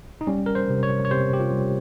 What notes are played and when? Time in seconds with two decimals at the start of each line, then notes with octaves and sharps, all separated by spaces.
0.21 D#4
0.27 G3 C#4
0.46 A#4
0.55 C5
0.70 C3
0.83 C#5
1.05 C#5
1.11 C3 C5
1.33 G4
1.40 F4
1.53 G3